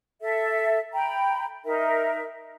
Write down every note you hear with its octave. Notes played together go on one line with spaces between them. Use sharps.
A4 E5
G5 A#5 B5
D#4 A#4 E5